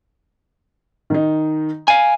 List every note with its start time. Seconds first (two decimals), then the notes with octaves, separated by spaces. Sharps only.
1.10 D#3 D#4
1.88 F5 G#5 D#7